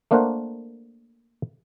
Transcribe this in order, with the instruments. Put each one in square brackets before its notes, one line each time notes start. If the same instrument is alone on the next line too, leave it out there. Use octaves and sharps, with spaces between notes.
[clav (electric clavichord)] A3 A#3 D4 A#4 C5 F#5